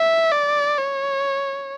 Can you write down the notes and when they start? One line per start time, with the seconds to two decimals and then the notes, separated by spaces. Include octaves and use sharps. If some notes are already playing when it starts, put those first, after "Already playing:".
Already playing: E5
0.32 D5
0.78 C#5